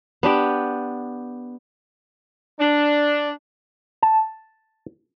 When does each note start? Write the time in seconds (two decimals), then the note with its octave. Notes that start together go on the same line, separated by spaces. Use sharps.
0.23 B3 D4 G4 G5
2.60 D4
4.02 A5